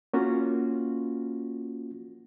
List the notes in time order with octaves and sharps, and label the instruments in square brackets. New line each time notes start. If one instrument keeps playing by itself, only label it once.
[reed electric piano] A#3 C#4 F4 F#4